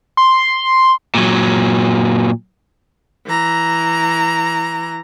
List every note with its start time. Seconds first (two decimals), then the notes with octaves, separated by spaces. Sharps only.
0.17 C6
1.15 A#2 F#3
3.27 E3 A#5